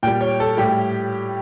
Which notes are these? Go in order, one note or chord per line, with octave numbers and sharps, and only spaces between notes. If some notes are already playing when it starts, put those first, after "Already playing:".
A#2 G3 G5
C#5
A4
A2 G3 G4